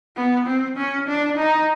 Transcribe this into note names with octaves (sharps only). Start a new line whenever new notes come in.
B3
C4
C#4
D4
D#4